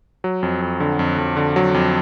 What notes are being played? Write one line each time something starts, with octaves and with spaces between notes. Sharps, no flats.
F#3
F2
F2
D3
F2
F2
D3
F#3
F2